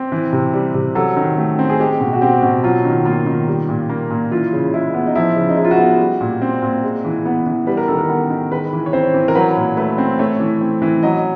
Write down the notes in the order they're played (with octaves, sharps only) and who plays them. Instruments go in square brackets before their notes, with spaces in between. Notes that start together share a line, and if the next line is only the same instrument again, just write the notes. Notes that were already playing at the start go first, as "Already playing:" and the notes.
Already playing: [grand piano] C4 G4
E3
C3
G3
C3
F#3 A4
D#3
A3
C4
G#4
G#3 G4
B2
F#4
C4 G4
B2
F#3 F4
D#3
A#3 F4
D#3
G3
A#2
A#3
A#2
E3 F4
C#3
G#3 E4
B3
D#4
F3 E4
C#3
D#4
G#3 E4
F4
F#4
B3
G3
A#2
C4
A#2
G#3
E3
B3
E3
G3 B4
A#4
D#3 A4
A#4
B3
D#3
G#3 B4
E3
C#5
C4 C5
E3
A#4
F#3 B4
A#2
A3 B4
C4
A3 C#5
E3
C4
E3
F#3 D#5